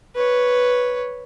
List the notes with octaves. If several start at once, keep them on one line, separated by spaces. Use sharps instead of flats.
B4 C#5